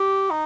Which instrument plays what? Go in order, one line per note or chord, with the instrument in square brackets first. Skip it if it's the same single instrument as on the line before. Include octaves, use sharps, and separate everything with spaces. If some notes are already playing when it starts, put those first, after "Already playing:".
Already playing: [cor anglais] G4
D#4